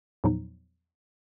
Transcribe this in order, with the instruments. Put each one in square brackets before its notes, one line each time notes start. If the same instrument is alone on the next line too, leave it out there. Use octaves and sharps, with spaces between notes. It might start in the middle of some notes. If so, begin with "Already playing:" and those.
[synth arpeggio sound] E2 A#2 F3 F#3 D#4